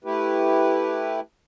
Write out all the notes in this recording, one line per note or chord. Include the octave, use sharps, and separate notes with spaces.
A3 E4 G4 B4